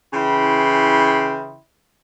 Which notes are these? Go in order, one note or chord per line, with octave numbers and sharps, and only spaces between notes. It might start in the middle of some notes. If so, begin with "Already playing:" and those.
C#3 E3 E4 G5 B5 C6